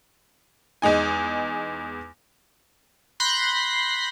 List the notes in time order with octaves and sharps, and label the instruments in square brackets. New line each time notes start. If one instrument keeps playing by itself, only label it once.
[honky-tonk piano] E2 G#3 D#4 G#5
[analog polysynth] B5 C6 F#6 G6 A#6 C7